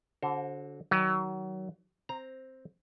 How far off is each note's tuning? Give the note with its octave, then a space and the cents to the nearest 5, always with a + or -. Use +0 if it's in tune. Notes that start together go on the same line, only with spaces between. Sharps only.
D3 -25 F#4 -5 C5 +25
D#3 +25 F#3 +25
C4 +5 A#5 +0